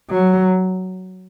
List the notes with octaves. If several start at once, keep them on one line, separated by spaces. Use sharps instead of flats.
F#3